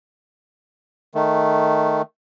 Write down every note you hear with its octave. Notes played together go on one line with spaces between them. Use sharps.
D#3 A3